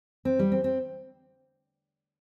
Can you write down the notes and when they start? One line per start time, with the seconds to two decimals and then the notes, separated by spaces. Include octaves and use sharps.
0.25 C4
0.39 G3
0.52 C4
0.64 C4